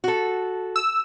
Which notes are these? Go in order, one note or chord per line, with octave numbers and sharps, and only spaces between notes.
F#4 A4
E6